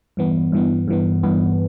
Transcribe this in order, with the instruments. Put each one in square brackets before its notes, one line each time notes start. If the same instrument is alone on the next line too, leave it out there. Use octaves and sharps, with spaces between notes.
[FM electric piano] G2 E3 B3
G2 E3 B3
G2 E3 B3
G2 E3 B3